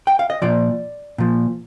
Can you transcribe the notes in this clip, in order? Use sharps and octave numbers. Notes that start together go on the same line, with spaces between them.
G5
F5
D#5
A#2 F3 D5
A#2 F3